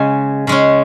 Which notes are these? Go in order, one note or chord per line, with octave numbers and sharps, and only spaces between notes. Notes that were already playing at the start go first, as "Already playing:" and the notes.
Already playing: C#3 G#3 C#4 G#5
C#3 G#3 C#4